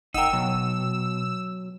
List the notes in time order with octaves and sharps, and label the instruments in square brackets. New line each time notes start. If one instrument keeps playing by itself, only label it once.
[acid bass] F#1 [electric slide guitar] D#4 A#4 [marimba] F#5 G5 [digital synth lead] E6
[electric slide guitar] B2 [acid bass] F#3